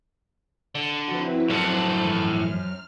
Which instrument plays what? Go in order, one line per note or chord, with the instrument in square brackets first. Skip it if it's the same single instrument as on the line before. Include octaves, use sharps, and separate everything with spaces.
[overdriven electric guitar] D3
[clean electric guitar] F3 F#4 [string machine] C4 E4 B4
[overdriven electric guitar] F#2 [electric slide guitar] A2 A4 F#5 [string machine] C5 A5
[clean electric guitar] G2 E3 F3 [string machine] F6